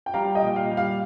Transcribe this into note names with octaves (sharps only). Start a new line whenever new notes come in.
G5
G3 F5 A#5
D#5 G5
A#2
F5
G3
F5